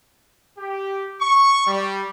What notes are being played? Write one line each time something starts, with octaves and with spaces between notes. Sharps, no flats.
G4
C#6
G3